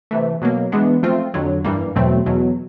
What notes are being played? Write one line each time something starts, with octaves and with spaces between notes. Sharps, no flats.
C3 E3 A3
B2 F#3 A#3
E3 G#3 B3 D4
F3 A3 C4 F4
F2 D3 F#3
G2 E3 G3 A#3
E2 B2 F#3 A3 C4
E2 B2 F#3